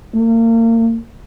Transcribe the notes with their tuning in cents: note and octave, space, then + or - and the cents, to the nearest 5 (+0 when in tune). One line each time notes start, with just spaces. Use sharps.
A#3 -35